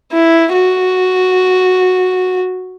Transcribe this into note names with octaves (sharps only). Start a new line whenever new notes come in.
E4
F#4